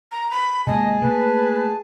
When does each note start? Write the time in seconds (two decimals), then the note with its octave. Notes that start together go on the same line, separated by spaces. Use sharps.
0.12 A#5
0.31 B5
0.67 C3 G#3 A#3 G#4 D#5 G#5 A5
1.02 A3 A#3 B4